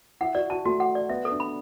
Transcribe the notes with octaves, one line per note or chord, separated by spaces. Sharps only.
E4 F#5
F#4 D5
F#4 A5
A3 F#4
F#5
D5
B3 E5
A4
D4
B5